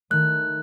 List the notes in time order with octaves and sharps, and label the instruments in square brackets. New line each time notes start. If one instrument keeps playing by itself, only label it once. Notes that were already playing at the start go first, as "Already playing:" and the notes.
[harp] D#3 A3 [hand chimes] F#6